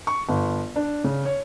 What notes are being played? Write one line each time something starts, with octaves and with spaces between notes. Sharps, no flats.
C#6
G1
D4
C#3
C#5